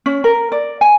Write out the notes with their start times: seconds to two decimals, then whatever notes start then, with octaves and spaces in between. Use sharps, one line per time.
0.06 C#4
0.24 A#4
0.52 D5
0.81 G#5